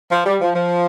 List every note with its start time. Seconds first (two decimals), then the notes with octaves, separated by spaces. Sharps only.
0.12 F3
0.26 G3
0.41 F3
0.55 F3